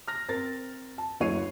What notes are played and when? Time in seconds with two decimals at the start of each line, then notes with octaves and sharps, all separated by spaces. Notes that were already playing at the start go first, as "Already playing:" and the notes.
0.08 F6 A#6
0.29 C4 A#4 A6
0.98 A5
1.20 F#1 D2 E4 C#5 C7 D#7